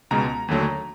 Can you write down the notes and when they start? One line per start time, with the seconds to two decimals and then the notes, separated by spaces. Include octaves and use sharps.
0.11 C#2 B2 G#3 A#5
0.48 D#2 D3 F#3 A3